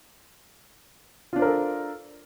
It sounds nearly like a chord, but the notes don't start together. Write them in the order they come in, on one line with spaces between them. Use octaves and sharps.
F4 D4 C5 A#4 A4